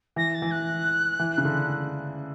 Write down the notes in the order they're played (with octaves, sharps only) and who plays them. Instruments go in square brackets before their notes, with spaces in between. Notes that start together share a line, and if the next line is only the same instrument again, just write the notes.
[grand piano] E3 [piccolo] A#6
[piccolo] A6
[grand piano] E3
[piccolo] F#6
[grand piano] E3
C#3
D3